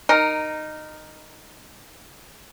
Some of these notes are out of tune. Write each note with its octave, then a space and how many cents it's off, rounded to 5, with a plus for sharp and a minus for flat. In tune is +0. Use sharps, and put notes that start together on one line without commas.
D#4 -15 A#4 +0